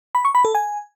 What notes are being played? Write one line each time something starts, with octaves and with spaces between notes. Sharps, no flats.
B5
C#6
B5
A4
G#5